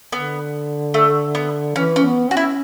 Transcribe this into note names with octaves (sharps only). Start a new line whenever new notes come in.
D3 B3
A3
B3
E3 C#4
C#4
B3
C#4 F#4
E4